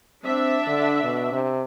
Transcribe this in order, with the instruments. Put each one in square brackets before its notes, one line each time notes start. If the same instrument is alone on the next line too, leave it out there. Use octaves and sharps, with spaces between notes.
[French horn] C4 [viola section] D4 E5
[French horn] D3
B2
C3